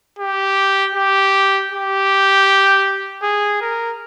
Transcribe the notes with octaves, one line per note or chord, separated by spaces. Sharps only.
G4
G4
G4
G#4
A#4